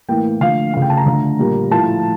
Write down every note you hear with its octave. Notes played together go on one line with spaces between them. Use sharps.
A2 E3 A#3 G5
D3 F3 A3 F5
C#3 F3 A3 F5
G5
A5
A#5
D3 F3 A3
A#2 G3 A#3
A2 F3 A3 A5